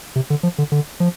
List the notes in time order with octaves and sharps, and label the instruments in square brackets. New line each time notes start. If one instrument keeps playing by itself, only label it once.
[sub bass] C3
D3
F3
D3
D3
F3